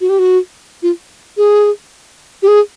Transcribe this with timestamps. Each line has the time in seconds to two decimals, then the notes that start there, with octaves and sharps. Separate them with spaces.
0.01 F#4
0.09 G4
0.19 F#4
0.83 F4
1.37 G#4
2.43 G4
2.48 G#4